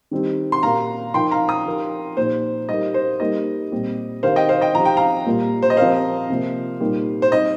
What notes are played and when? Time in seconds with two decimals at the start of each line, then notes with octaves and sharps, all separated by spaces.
0.11 D#3 G3 C4 D#4 G4
0.52 C6
0.63 A#2 A#3 G4 A#4 F5 A#5
1.14 F3 D#4 A#4 G5 C6
1.31 F5 A#5
1.48 A#5 D#6
1.66 F3 D#4 G4 A#4
2.17 A#2 F3 D#4 G4 C5
2.69 G3 D#4 G4 A#4 D#5
2.94 C5
3.20 G3 A#3 D#4 A#4 D#5
3.72 A#2 G3 C4 G4
4.23 D#3 C4 G4 A#4 C5 F5
4.36 D#5 G5
4.49 C5 F5
4.61 D#5 G5
4.75 F3 D#4 G4 A#5
4.85 G5
4.97 F5 A#5
5.26 A#2 G3 A#3 F4 A#4
5.63 C5
5.70 D#5
5.77 F3 C4 G4 A#4 C5 F5
6.29 C3 F3 A#3 F4
6.80 A#2 G3 D#4 G4 A#4
7.22 C5
7.32 G3 C4 D#4 D#5